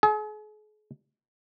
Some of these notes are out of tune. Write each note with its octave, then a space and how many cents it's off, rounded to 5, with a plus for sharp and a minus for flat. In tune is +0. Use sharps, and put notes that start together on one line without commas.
G#4 +40